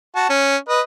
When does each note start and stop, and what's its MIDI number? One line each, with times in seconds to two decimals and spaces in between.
0.15 0.28 66
0.15 0.28 81
0.30 0.57 61
0.69 0.81 71
0.69 0.81 75